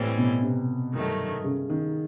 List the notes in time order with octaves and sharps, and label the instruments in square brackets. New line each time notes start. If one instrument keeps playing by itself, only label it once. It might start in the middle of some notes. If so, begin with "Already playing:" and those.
Already playing: [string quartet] A2 E3 G3 C4
[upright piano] B2
C3
[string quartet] G2 D#3 F#3 A3
[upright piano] C#3
D#3